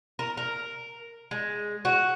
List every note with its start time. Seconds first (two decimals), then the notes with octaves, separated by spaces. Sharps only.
0.19 A#4
0.37 A#4
1.31 G#3
1.85 F#4